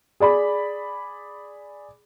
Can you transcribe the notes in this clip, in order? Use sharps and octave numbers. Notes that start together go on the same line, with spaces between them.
G#4 D5 B5